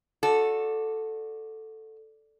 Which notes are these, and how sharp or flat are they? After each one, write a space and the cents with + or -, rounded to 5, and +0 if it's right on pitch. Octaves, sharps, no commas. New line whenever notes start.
F#4 -25 A4 +0 D5 +0